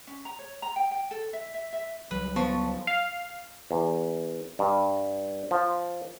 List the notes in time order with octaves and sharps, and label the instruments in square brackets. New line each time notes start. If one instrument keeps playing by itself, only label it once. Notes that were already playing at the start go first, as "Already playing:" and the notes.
[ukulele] C#4
A#5
C#5
A#5
G5
G5
A4
E5
E5
E5
[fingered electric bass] C#2 F#3 G3 [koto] B4
[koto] F3 [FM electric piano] B3 A5 C#6
[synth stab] F5
[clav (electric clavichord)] E2
G2
F3